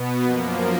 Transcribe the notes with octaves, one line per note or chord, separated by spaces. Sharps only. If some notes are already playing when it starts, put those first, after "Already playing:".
Already playing: B2 B3
F#2 F3 A#3